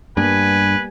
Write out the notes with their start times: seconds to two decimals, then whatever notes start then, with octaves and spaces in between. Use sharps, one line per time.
0.17 G2 G3 A#3 B3 B4 G#5